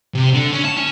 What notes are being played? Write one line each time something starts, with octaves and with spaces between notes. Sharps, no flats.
C3
D3
C#4
A5
C#4